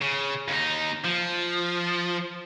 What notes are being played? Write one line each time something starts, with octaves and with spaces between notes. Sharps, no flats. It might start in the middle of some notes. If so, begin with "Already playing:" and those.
C#3
D#2 D#4
F3